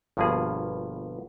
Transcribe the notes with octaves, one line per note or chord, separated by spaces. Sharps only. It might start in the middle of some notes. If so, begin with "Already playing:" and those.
G1 G2 B2 F3 A#3 G#4